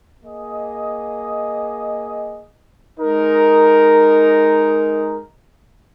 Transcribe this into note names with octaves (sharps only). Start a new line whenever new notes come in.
A#3 G#4 D#5
G#3 D#4 A#4